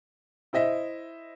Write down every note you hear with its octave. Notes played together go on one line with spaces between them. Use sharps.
E4 C5 D#5 E5